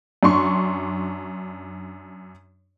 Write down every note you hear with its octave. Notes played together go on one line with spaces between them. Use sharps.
F#2 D4 C6 C#6